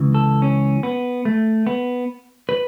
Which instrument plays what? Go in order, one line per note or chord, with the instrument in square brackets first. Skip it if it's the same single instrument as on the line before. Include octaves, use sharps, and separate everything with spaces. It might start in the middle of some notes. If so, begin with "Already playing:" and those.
Already playing: [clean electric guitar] C#2 C#3 E3
A4
C#4
B3
A3
B3
B4